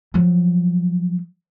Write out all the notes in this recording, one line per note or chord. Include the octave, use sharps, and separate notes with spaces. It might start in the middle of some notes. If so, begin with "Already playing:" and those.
F3 F#3